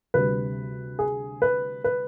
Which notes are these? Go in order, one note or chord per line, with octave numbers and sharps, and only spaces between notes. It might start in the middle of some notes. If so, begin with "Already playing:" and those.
D2 C3 G3 B4
G#4
B4
B4